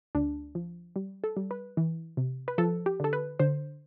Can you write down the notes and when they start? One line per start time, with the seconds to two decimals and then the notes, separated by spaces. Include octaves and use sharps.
0.15 D2 D4
0.55 F3
0.96 G3
1.24 A4
1.37 G3
1.51 B4
1.77 E3
2.17 C3
2.48 B4
2.58 F3 A4
2.86 G4
3.00 D3 A4
3.13 B4
3.39 D3 C5